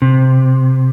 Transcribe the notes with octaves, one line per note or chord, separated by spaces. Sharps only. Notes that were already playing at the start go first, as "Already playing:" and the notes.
C3